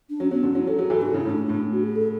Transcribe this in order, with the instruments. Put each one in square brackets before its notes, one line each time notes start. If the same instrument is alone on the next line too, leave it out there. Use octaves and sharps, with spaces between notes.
[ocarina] D4
[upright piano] F#3 [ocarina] C#4
[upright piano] F#3 [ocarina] B3
[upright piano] D3 [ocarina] C#4
[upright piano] F#3 [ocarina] E4
[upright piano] F#3 [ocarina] A4
[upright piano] F#3 [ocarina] G#4
[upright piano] E3 [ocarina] A4
[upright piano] D3 [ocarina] F#4
[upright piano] C#3 [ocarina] E4
[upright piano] A2
[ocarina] D4
E4
[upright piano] A2 [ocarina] D4
[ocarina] F#4
G#4
A4